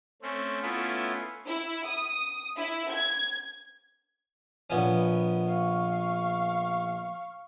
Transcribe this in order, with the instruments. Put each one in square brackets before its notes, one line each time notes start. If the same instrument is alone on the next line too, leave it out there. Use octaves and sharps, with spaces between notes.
[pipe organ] A3 C4 C#4
A3 B3 C#4 E4 F4
[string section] E4
D#6
E4
G#6
[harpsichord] A#1 B3 C#4
[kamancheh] F5 C#6